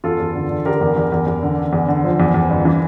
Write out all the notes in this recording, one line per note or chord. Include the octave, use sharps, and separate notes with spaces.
E2 F4 A4
E2
D3
D3
D3 G4 A#4
E2
E2
E2
E2
D3
D3
E2
D3
F3
E2
E2
G1
E3